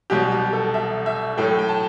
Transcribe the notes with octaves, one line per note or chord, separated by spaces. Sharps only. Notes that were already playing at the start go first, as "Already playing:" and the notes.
C2 B2 F#3 G4
G4
A4
E5
E5
A2 F#3 A3 G5
G5
A5